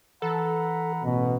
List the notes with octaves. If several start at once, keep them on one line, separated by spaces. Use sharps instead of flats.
E3 A4 F#5 A#5 B5
A1 B2